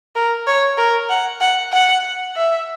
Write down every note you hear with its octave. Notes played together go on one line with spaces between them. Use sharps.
A#4
C#5
A#4
F#5
F#5
F#5
E5